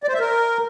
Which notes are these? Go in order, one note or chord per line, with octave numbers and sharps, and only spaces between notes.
D5
C5
E5
A#4